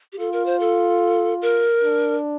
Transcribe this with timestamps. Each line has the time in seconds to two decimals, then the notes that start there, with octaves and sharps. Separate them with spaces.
0.13 G4
0.19 F4 A4
0.33 A#4
0.46 C5
0.60 A4
1.42 A#4
1.84 D4